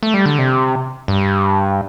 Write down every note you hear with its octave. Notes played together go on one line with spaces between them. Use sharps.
A3
G3
D3
C3
G2